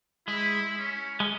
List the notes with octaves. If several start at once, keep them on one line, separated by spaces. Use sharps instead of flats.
G#3 E4
C#4
G#3